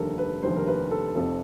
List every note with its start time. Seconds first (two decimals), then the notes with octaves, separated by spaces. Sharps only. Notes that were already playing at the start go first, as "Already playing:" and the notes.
Already playing: F1 D#2 D3 G3 A4 A#4
0.18 B4
0.42 F1 D#2 D3 G3 C5
0.56 A#4
0.67 B4
0.91 A4
1.15 F1 F2 C3 A4